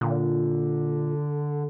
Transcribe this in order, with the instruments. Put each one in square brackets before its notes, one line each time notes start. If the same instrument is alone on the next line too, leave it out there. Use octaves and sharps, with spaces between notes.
[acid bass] A#2 [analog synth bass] D3